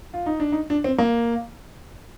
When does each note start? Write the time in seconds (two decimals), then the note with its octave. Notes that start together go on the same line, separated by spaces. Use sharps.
0.14 F4
0.26 D#4
0.40 D4
0.52 D#4
0.70 D4
0.84 C4
0.98 A#3